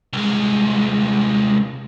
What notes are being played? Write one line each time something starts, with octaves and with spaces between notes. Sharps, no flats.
C2 G#3